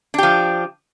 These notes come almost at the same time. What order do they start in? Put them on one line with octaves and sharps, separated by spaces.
D4 G4 F3